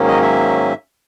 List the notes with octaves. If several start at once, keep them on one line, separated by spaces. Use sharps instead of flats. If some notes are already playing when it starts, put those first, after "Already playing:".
Already playing: G#2 D#3 F#3 A#3 C#4
D#5
E5